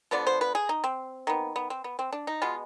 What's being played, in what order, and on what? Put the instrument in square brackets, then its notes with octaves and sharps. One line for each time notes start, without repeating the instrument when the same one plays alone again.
[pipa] D3 F3 B3 D5
C5
B4
G#4
D#4
C4
D#3 B3
B3
C4
B3
C4
D4
D#4
B2 G#3 B3 F4